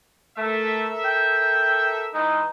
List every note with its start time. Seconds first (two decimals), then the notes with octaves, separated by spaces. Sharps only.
0.37 A3 A4 A#4 E5
1.05 G5
2.14 E3 G#3 D#4